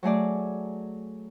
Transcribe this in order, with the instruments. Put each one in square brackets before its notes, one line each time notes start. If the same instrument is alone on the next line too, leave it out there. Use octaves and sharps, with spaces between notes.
[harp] F#3 A3 G#4 D5